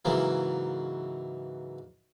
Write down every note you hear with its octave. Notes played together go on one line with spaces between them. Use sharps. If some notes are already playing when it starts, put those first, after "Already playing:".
G#2 C#3 E3 F#3 A#3